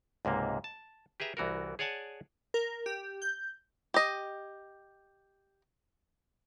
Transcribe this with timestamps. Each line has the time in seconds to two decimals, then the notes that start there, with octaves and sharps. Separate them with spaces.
0.25 C#2 G#2 C3 A#3
0.64 A5
1.20 G4 G#4 B4 E5 A#5
1.37 C2 E3 F#4 A#4
1.79 G#4 C#5 D5 F#5 G#5 A5
2.54 A#4
2.86 G4
3.22 G6
3.94 G4 D#5